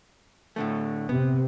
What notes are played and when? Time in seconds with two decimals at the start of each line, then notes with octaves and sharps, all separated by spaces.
0.56 A2 D3 A3
1.09 C3 B3